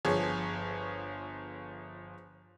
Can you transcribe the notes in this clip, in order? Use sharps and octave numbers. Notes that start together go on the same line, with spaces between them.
G1 F3 G#4 C#5